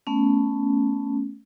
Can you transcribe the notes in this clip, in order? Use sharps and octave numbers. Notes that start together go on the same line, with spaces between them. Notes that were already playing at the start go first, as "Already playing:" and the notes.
A3 B3 C#4